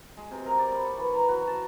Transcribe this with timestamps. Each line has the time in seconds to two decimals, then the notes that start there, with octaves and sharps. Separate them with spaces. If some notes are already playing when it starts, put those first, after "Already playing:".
0.17 G#3
0.31 C3
0.46 A#4
0.59 D5
0.72 B5
0.84 C#6
0.97 E3
1.13 A#5
1.28 F#4
1.47 A5